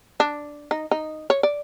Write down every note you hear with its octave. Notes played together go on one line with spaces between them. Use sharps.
D4
D#4
D#4
C#5
D5